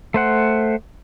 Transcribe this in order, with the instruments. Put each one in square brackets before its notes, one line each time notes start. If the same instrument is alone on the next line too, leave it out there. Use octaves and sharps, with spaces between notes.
[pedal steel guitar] A3 C5 F#5